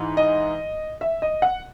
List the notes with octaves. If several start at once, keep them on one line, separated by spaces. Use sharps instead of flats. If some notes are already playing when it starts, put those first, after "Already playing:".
Already playing: G#2 E3
D#5
E5
D#5
F#5